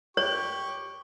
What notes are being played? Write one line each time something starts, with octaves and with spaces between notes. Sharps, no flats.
G4 C#5 C#6